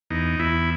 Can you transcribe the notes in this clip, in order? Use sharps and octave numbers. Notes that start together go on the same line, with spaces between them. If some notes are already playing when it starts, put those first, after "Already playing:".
E2 D#4
E2 E4